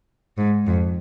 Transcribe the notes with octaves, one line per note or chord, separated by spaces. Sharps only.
G#2
F2